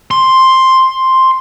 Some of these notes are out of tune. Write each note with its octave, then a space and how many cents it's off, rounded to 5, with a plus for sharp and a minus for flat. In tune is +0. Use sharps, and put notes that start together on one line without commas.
C6 +5